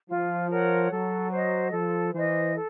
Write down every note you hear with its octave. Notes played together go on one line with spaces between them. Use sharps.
F3 F4
A#4 C#5 F#5
F#3 A4
C5 D#5
F3 A4
E3 C5 D#5
A4